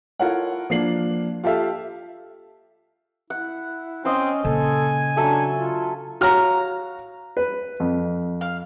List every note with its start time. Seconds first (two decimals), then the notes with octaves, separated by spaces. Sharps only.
0.19 E4 F4 A4 A#4 C#5 F#5
0.70 F3 A#3 D4 C7 F#7
1.44 F4 G4 A4 E5 F5
3.30 E4 F#5
4.05 C4 C#4 D#5 F5 C6
4.45 A#2 C#3 A4 G#5
5.16 F#3 D4 A4 E5
5.56 F4
6.21 F#4 C#5 F5 A#5 F6
7.37 B4
7.80 F2
8.41 F5